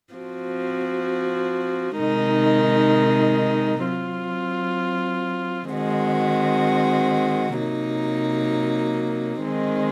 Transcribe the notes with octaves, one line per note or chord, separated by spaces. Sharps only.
F3 C4 F#4
C3 D#3 G#3 D#4
F#3 C4 F4
D#3 G#3 C4 F#4
C3 F#3 A#3 D#4
D#3 G#3 C4